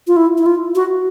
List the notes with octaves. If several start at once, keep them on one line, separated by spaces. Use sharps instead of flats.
F4
E4
E4
F4
F#4